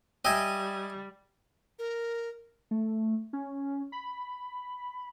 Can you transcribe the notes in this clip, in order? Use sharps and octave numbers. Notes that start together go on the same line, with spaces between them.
G3 D#5 E5 G5 G#5
A#4
A3
C#4
B5